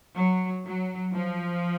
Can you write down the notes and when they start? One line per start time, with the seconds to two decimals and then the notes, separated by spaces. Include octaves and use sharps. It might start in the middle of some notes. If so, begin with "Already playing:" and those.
0.15 F#3
0.64 F#3
1.14 F3